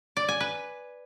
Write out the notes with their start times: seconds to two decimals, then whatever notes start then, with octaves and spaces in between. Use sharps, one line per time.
0.17 D5
0.29 G#5
0.40 B4